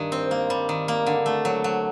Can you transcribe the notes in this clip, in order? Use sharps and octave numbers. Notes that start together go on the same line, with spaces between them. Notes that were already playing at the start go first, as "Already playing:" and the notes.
Already playing: G2 D#3
C4
A#3
G3
D#3
A#3
D3
A3
F#3
F#3